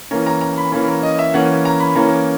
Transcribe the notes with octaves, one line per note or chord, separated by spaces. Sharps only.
E3 A#3 C#4 A#5
A#5
A#5
B5
E3 A#3 C#4 B5
A#5
D#5
E5
E3 A#3 C#4 F#5
A#5
B5
E3 A#3 C#4 A#5